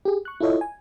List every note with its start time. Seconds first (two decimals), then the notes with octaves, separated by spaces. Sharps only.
0.05 G4 G#4
0.25 C#6 F#6
0.40 E4 F4 A4 C#5 D#5 E5
0.61 G#5